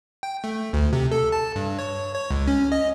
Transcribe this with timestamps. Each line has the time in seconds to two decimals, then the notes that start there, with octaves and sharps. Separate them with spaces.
0.23 G5
0.44 A3
0.73 D2
0.93 C3
1.11 A4
1.32 A5
1.56 G2
1.79 C#5
2.14 C#5
2.31 C#2
2.47 C#4
2.72 D#5